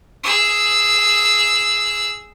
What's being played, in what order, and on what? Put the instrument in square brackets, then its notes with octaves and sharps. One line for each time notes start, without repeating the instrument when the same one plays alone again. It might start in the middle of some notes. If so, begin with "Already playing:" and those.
[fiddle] G#4 E6